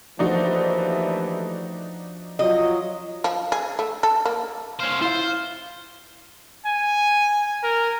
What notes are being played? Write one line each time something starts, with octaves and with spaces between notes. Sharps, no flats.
D#2 E3 F3 A3 D4 D#4 F#4
F#3 F4 D#5
F3
G#4
A3
A4
A#3
C#4 C5 F5
E4 F4 C5 F5
G#5
A#4